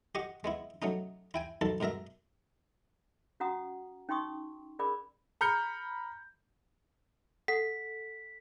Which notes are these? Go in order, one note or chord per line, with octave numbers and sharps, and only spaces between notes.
G4 D#5 F#5 C#6
G#3 B3 E4
F#3 A3 C#4 D#4
E4 G5 G#5
B1 D#3 A4 A5
G#2 B2 A#4 E5 A#5
C#4 F#4 F#5 A#5 D#6
C#4 D#4 G5 C6 C#6 D#6
C#4 G#4 A#4 D5 B5 D6
A#5 B5 F6 G6 C#7
A4 F#5 B6